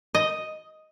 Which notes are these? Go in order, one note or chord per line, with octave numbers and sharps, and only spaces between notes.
D#5